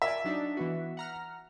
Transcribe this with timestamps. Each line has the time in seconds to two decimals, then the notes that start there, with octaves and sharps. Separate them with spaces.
0.02 A#4 D5 E5 G#5
0.25 F#3 D4 D#4
0.57 E3 B3 F#4
0.97 F#5 A#5 F6